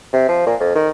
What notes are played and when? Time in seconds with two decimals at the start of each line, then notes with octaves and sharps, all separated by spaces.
0.13 C3
0.28 F3
0.46 A#2
0.60 F2
0.75 D#3